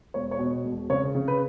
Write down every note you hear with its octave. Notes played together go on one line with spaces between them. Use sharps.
E1 C#5
C#5
B2
E1
C#3 C#5
C#3
B4